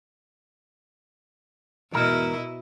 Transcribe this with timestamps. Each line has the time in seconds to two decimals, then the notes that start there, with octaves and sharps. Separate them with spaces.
1.92 E2 G#2 B2 E4 A#4 D#5